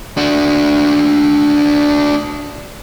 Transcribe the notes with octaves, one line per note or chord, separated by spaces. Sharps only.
D4 F#4